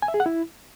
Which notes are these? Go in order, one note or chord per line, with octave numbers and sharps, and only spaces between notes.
G#5
E5
G#4
F#5
E4